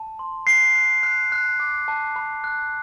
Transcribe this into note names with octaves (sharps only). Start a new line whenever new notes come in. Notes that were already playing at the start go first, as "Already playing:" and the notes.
Already playing: A5
C6
F#6 C7
F#6
F#6
F#6
D6
A5
B5
F#6